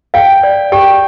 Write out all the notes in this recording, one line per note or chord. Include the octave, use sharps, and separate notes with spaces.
F5 G5
D5
G4 G5